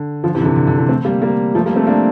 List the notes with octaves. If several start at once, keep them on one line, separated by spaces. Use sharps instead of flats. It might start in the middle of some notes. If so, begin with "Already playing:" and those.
Already playing: D3
D3 F3
C3 E3
D3
C3
D3
D3
C3 E3
A3 C4
G3 A#3
G3 A#3
F3 A3
G3 A#3
A3 C4
A#3 D4